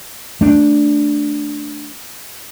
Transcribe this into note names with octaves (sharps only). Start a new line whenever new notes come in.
A3 D4